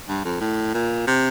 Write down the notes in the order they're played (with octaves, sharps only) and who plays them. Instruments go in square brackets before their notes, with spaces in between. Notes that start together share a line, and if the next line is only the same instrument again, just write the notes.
[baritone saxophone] G2
F2
A2
A#2
C3